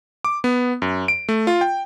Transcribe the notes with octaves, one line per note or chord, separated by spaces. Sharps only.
D6
B3
F#2
D7
A3
F4
G5